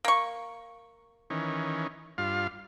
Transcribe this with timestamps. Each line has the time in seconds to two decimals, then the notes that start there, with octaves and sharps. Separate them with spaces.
0.05 A#3 C#6
1.30 D#3 E3 C#4
2.18 G2 F4 F5